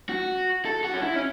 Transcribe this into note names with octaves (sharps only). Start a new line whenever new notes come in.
F#4
A4
F#4
C#4
E4
C#4